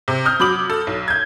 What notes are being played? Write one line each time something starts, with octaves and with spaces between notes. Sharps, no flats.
C3
D#6 F6 G6
F#3 B5 D6 F#7
A4
B1
G6 G#6